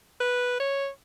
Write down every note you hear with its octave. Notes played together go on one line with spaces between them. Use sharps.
B4
C#5